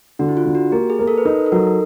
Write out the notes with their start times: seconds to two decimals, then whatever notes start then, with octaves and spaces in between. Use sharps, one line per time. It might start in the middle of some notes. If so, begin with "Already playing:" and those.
0.19 D3 F#4
0.29 E4
0.37 F4
0.46 D3
0.55 F#4
0.72 A#3 G4
0.90 G#4
0.99 A#3
1.08 A4
1.18 B4
1.25 D#4 A#4
1.46 A4
1.52 F#3 A#4